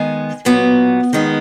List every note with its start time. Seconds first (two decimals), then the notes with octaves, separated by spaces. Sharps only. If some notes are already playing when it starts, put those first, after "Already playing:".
Already playing: D#3 G#3 B3 G#5
0.45 A#2 F#3 B3
1.13 D#3 G#3 B3